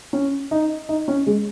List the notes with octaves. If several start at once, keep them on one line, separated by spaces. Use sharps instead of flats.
C#4
D#4
D#4
C#4
G#3